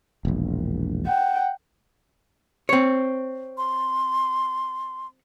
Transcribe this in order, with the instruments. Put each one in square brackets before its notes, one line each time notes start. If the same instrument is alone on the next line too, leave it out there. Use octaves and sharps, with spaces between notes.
[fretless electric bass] E1 A#1
[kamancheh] F#5 G5
[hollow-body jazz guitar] C4 C#5
[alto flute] C6